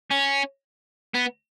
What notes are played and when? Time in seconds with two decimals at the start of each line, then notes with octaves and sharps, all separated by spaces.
0.11 C#4
1.15 B3